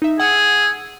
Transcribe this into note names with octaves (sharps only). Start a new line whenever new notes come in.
D#4 E5
G#4 F#5 E6